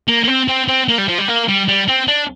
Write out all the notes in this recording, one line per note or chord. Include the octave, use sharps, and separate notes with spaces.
A#3
A#3
C4
C4
C4
A#3
G3
F3
G3
A#3
G3
G3
C4
D4